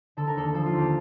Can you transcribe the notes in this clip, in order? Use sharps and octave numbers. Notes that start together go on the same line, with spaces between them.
D3 A4
A#4
D#2 A4
F3 A4
F4
D#2
G4